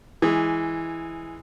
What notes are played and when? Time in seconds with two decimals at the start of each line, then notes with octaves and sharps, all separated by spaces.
0.22 E3 G#3